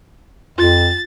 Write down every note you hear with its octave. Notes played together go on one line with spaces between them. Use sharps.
F2 F4 A6